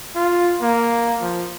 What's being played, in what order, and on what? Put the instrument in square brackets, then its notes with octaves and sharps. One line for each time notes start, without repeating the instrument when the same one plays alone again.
[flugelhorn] F4
A#3
F3